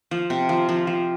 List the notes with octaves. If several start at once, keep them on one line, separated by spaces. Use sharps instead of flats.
F3
C3
F3
F3
F3